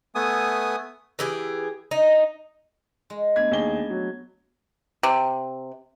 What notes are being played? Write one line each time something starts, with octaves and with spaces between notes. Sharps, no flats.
A3 B3 G#5 D#6
E3 G4 G#4
D#4
G#3
A3 B3 D4 G#6
D#2 G#4 G7
F#3
C3